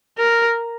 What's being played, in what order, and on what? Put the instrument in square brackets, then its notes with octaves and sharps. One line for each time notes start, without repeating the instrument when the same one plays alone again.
[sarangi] A#4